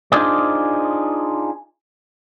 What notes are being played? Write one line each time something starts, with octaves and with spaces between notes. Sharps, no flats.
D4 D#4 F4 G#4 C5 D5